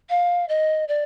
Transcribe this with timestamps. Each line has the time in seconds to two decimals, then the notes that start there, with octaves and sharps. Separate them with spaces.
0.09 F5
0.49 D#5
0.88 D5